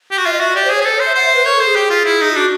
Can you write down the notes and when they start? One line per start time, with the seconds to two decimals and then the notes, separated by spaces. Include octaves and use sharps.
0.11 G4
0.18 F#4
0.25 F4 E5
0.33 D#5
0.40 F#4 E5
0.55 G4 D5
0.65 C5
0.70 G#4
0.75 C#5
0.81 G#4
0.85 A4 C5
0.95 C#5
1.00 C5
1.06 E5
1.15 C5 F#5
1.26 E5
1.35 B4
1.46 A#4 C#5
1.55 A4
1.60 C5
1.66 G#4
1.76 G4
1.90 F4
2.05 E4
2.21 D#4
2.31 F4
2.35 D4 F#4